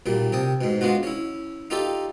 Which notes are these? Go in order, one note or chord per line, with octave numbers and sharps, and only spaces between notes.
B1 A#2 G3
C3 G5 A5 D#6
G#2 B2
G#3 B3 D4 F4 F#4
C#4 E4
D#4 F4 G4 A4 D5 E5